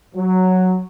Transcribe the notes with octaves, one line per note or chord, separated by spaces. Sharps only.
F#3